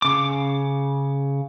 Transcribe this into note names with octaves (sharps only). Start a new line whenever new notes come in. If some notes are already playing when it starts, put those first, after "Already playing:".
C#3 D6